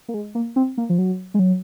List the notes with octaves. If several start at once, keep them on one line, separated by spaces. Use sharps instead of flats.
A#3
G#3
A#3
C4
A#3
F3
F#3
G#3
F#3